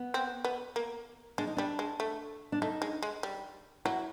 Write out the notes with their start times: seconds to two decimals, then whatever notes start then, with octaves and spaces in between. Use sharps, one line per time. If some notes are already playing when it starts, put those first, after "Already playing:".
Already playing: B3
0.14 C4
0.45 B3
0.76 A#3
1.38 G#3 D4
1.47 D#4
1.57 G3 D4
1.79 G#3
2.00 A3
2.52 D4
2.62 A3 D#4
2.82 G#3
3.03 G#3
3.23 G3
3.85 F#3 E4